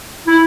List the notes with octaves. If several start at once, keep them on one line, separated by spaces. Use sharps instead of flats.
E4